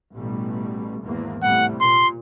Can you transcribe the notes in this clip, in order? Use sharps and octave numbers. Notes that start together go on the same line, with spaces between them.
A1 B2 G3
G#1 E2 A#3
A2 C3 G3 F#5
A#2 C6